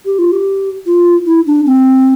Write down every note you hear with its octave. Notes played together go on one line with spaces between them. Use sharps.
G4
F4
G4
F4
E4
D4
C4